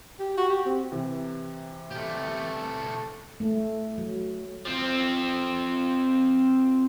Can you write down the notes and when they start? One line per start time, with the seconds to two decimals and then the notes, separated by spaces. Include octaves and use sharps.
0.19 G4
0.37 F#4
0.50 G4
0.66 C4
0.92 C3 E3
1.91 A3 G4
3.40 A3
3.98 F#3
4.65 F3 C4